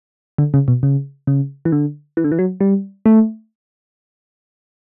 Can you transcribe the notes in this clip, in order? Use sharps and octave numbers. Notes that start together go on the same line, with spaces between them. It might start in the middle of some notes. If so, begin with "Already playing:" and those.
D3
C#3
B2
C#3
C#3
E3
D3
E3
D3
E3
F#3
G3
A3